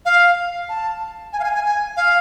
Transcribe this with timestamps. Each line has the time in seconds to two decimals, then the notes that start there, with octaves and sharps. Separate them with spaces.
0.05 F5
0.69 A5
1.33 G#5
1.40 F5
1.44 G#5
1.55 G#5
1.66 G#5
1.97 F5